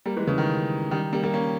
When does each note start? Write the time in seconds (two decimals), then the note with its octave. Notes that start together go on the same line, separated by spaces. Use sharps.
0.06 G3 A#3
0.17 E3 G#3
0.27 C#3 E3
0.38 D#3
0.91 D#3 G3
1.12 G3 A#3
1.23 G3 A#3
1.34 A#3 C#4